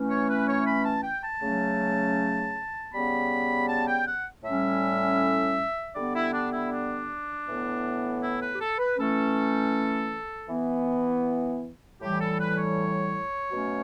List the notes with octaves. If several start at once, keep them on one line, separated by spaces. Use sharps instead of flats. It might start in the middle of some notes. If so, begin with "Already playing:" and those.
Already playing: E3 A3 C#4
C#5
B4
C#5
B5
A5
G5
A5
C#3 F#3 A3 C#4
C#3 G3 B3 B5
A5
G5
F#5
A2 G3 C#4 E5
D3 G3 B3 D5
E4
D4
E4
D4
A2 E3 B3
E4
B4
G4
A4
B4
E3 A3 C#4 A4
E3 B3
A2 E3 G3 G4
A4
B4
C#5
B2 F#3 A3 C#4